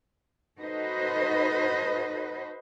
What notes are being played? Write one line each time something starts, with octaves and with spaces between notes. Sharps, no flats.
D#4 F#4 A4 B4 C5 D#5